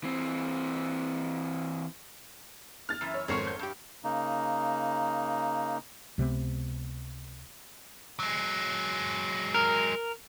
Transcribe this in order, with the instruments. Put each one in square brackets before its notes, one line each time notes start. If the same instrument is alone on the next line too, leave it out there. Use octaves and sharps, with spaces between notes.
[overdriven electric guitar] E3 C4
[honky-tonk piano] F6 A6
[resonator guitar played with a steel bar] F#2 E3
[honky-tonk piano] C#5
[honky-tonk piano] G#1 F2 C#6 [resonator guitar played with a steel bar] A#4 C5 C#5
[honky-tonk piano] G6
[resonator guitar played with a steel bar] G2 G4
[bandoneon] C#3 A#3 D#4
[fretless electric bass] C#2 C3 G#3 B3
[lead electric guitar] F#3 G#3
[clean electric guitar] A#4